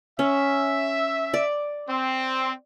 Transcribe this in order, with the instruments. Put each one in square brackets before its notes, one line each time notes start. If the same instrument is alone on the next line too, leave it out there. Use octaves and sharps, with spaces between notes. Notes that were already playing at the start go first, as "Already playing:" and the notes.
[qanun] C#4 [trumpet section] E5
[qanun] D5
[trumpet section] C4